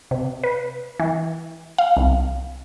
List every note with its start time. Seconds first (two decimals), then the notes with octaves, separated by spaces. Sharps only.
0.11 C3
0.43 B4
1.00 E3
1.78 F5
1.97 C2